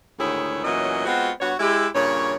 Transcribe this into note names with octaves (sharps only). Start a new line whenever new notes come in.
D2 G#2 D#3 E4 G#4 C#5
E2 A#2 E3 F#3 C#4 D#5
G#3 B3 C4 F4 F#4
G2 B3 F#4 C#5
G#3 E4 G4
G2 A#2 C#3 C#5